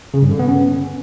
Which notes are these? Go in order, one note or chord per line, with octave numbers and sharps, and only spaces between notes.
C#3
G2
D3
B3
C#4